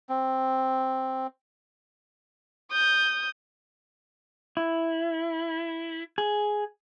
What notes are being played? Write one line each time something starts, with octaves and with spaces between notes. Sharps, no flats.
C4
D#6 G6
E4
G#4